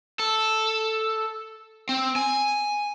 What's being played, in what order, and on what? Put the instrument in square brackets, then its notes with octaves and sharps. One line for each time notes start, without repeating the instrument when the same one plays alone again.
[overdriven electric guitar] A4
C4
G#5